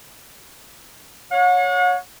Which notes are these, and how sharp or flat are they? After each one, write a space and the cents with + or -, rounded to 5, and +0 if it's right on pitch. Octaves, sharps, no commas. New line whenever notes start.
C#5 +5 F#5 -40